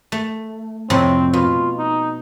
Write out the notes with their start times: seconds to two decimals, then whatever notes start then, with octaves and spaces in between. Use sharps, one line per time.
0.12 A3
0.90 F2 A2 C3 C4
1.33 B2 F4
1.78 D#4